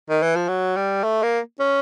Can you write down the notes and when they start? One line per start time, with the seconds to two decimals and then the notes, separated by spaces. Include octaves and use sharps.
0.09 D#3
0.22 E3
0.36 F3
0.48 F#3
0.76 G3
1.04 A3
1.23 A#3
1.60 C#4